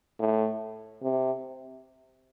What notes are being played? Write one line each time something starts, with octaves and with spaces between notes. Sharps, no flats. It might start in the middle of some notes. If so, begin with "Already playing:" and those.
A2
C3